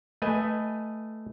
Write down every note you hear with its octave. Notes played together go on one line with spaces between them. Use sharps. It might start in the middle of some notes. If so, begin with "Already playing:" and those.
A3 B4 D#5 G#5